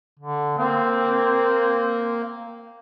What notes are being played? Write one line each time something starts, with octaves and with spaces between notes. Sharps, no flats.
D3
A#3 C4